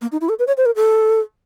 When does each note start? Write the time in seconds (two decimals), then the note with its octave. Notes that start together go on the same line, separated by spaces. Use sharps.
0.02 A#3
0.12 D#4
0.21 E4
0.29 A4
0.39 B4
0.47 C#5
0.57 C5
0.66 A#4
0.76 A4